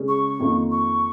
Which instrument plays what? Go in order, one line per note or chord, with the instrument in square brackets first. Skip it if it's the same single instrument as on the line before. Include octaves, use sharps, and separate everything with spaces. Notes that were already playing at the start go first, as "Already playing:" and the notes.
Already playing: [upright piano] C#3 G#3 C#4 G#4
[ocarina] C#6
[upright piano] F2 D#3 A#3 F4
[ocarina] C#6